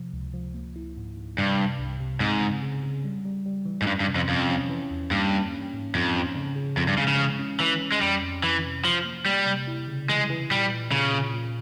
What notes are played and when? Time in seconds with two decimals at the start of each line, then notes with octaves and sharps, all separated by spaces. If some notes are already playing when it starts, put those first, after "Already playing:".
Already playing: C3 F3
0.13 C#2
0.34 F3
0.55 A#3
0.76 E4
0.97 G#2
1.17 G#2
1.38 G2 C3
1.58 C3
1.79 C2
2.00 C3
2.20 G#2 C4
2.41 C#3
2.63 C#3
2.84 C#3
3.04 G3
3.25 G3
3.46 G3
3.66 E3
3.82 G#2
3.86 G2 C#4
4.00 G2
4.08 C3
4.15 F2
4.28 F2 C#4
4.49 C#4
4.70 E3
4.91 E2
5.11 G2 A#3
5.32 A#3
5.52 C#4
5.74 G#2
5.95 F2 G#2
6.15 C#4
6.36 C#3
6.56 C#3
6.77 F2 F3
6.88 G2
6.98 C#3 G#3
7.08 C#3
7.19 E3
7.39 C#4
7.60 E3 C#4
7.80 C#4
7.92 G#3
8.01 F2 G3
8.22 F2
8.43 F2 E3
8.65 C3
8.85 E3 F3
9.05 A#3
9.26 G3 A#3
9.46 C3
9.68 E4
9.88 C#3
10.09 E3 G#3
10.30 E3
10.50 A#2 G3
10.72 A#2
10.92 A#2 C#3
11.13 A#2
11.33 A#2